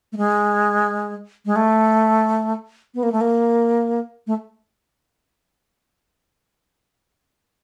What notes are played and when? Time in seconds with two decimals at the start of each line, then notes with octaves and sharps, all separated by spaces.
0.12 A3
0.17 G#3
1.46 G#3
1.56 A3
2.94 B3
3.03 A#3
3.12 A3
3.21 A#3
4.27 A3